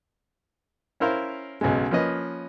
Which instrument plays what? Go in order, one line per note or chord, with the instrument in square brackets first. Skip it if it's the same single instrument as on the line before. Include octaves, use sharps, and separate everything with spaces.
[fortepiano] C#4 E4 A#4 C5 F5
B1 F#2 C#3 G#3
F3 A#3 C#4 B4 D#5